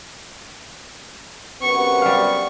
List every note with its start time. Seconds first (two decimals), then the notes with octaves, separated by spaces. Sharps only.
1.62 F#2 C3 B3 C#6
2.02 G3 F5